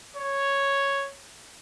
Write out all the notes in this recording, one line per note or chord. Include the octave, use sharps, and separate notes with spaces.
C#5